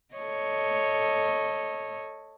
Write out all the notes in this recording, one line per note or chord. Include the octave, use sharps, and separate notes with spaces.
A4 C#5 D#5